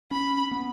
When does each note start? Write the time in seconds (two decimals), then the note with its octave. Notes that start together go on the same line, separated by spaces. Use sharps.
0.11 C#4 B5
0.52 B3